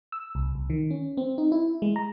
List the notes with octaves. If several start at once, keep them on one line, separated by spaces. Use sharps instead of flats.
E6
C2
C2
D#3
C#4
C4
D#4
E4
G#3
A#5